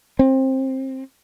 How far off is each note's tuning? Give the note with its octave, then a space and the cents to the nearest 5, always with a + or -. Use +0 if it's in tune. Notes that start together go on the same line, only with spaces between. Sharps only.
C4 +20